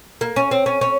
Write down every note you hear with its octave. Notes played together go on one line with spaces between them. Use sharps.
A#3
C#4
C4
C#4
C#4